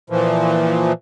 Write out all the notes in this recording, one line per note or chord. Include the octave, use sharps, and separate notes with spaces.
A#2 E3 F3